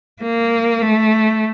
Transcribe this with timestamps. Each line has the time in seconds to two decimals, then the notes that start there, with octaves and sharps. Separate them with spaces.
0.23 A#3
0.82 A3